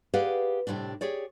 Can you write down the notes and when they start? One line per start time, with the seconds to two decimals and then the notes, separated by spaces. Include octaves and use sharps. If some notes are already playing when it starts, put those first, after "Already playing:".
0.14 G4 G#4 B4 D5 F5 F#5
0.67 A2 C3 F#3 G3 D4
1.01 G4 G#4 C#5 D5